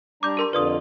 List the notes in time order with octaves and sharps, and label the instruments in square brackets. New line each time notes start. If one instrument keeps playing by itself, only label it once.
[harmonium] G3 D4 A#5 [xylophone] D6 G6
[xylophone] G4 A#4 C6
[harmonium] F2 D3 F4 [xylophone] B4 D5 D#6